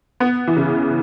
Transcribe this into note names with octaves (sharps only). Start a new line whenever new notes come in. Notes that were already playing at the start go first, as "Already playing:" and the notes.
B3
E3
C#3